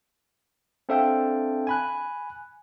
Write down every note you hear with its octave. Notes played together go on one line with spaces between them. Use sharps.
C4 D4 A4 E5 F5 G5
G#5 B5 F#6